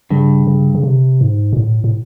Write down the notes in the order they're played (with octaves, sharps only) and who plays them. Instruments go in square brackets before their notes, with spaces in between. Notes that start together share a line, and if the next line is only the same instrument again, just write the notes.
[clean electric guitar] G2 [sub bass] C#3
[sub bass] C#3
C#3
C3
G#2
A#2
A2
A2